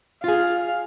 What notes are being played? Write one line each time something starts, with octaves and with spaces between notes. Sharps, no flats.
F4 G#4 F5